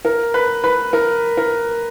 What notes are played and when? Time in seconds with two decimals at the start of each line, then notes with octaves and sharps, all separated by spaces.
0.05 A#4
0.34 B4
0.64 B4
0.93 A#4
1.37 A#4